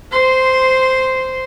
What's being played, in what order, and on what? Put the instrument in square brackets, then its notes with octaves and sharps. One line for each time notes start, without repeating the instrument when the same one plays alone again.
[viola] C5 C6